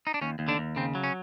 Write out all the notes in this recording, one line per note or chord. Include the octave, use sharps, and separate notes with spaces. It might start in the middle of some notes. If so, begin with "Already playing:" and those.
D#4
D4
D#2 C#4
D#2
D3 D4
D#2
C#3 C4
F#3
C#4